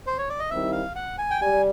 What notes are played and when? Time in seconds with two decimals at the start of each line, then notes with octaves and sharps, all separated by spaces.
0.07 C5
0.18 C#5
0.29 D5
0.39 D#5
0.51 D#3 G3 C4 E4 E5
0.72 F5
0.96 F#5
1.18 G#5
1.31 G5
1.41 G3 G#5